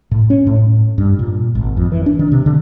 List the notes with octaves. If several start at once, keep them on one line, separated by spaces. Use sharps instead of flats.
A2
C#4
A2
G2
A#2
G#1
F2
E3
D4
D#3
C3
D3